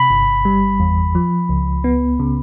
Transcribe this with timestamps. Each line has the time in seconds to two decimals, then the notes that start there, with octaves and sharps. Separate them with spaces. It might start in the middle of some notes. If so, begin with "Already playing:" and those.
Already playing: C3 B5
0.10 G1
0.45 G3
0.80 E2
1.15 F3
1.49 C#2
1.84 B3
2.20 C#3